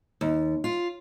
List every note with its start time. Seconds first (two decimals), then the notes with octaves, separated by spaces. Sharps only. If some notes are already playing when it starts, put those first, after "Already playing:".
0.21 D#2
0.64 F4